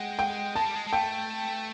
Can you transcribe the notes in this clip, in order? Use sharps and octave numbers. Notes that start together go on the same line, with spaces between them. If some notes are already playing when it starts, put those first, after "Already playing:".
Already playing: G#3 F#5 G5
G5
G#3 A5
G3
G#3
G#3
A3 G5